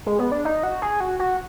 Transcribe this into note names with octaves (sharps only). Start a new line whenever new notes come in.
G#3
B3
D4
D#4
F#4
G#4
F#4
F#4